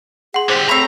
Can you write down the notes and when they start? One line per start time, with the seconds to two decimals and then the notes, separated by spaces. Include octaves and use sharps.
0.34 G#4 F#5 C6
0.49 D3 G4 C5 B6
0.69 A3 C4 C#5 A#5 B5